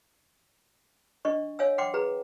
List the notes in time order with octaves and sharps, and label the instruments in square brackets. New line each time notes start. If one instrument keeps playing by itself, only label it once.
[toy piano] D4 D#5 C#6
C#5 F5 G#5 E6
F#5 G5 C6 D6
G#4 B4 A#5